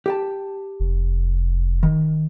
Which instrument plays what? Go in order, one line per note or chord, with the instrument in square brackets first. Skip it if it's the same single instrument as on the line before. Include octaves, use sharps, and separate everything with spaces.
[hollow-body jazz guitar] G4 G5 A5
[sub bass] F1
[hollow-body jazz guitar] D#3